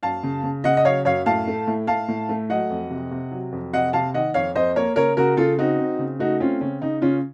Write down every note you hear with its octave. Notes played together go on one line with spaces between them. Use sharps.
F#2 F5 A5
C#3
C#3
C#3 D#5 F#5
D#5
F#3 C#5 F5
F#2 C#5 F5
A2 F5 A5
A3
A2
A2 F5 A5
A2
A3
F#3 D#5 F#5
F2
C3
C3
F#3
F2
C3 D#5 F#5
C3 F5 A5
D#3 D#5 F#5
F2 C#5 F5
F2 C5 D#5
A#3 A#4 C#5
C#3 A#4 C#5
C#3 F#4 A#4
C#3 F4 A4
C4 D#4 F#4
C4
C#3
A3 D#4 F#4
C4 C#4 F4
C#3 C#4
C#3 D#4
C#3 C#4 F4